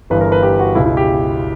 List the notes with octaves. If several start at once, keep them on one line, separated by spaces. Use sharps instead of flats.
G1 G2 E3 B4
A#4
B4
G4
F#4
C#2 B2 E4
E4
G4